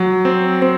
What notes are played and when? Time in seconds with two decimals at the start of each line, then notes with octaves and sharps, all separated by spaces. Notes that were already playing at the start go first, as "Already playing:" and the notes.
Already playing: F#3
0.25 C4
0.62 C4